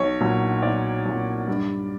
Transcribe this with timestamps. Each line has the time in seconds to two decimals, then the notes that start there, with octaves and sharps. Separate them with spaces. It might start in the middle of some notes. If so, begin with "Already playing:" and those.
Already playing: B1 C#5
0.20 A#2 F#3
0.63 B1 D5
1.06 A#2 F#3
1.48 G2